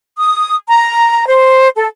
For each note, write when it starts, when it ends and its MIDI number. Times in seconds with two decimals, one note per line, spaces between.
0.19 0.54 87
0.68 1.25 82
1.26 1.69 72
1.74 1.87 69